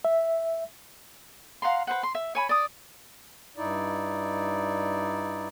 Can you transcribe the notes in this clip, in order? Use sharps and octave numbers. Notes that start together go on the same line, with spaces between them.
E5
F5 F#5 A#5 C6
B4 C5 F#5
C6
E5
C#5 G#5 B5
D5 D#6
G2 D#4 E4 D5